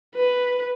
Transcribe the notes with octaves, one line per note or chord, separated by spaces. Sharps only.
B4